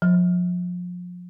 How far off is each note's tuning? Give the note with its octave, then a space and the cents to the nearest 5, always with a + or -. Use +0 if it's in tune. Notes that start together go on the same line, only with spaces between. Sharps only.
F3 +35